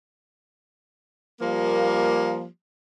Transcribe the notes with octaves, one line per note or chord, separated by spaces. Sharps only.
F3 G3 A#3